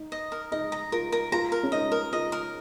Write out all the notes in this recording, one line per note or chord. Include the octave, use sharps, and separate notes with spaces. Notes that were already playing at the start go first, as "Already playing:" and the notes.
Already playing: D#4
D#5
A#4
D#4 D#5
A#5
F4 A#4
A#4
F4 A#5
A#4
C#4
D#4 D#5
A#4
F4 D#5
A#4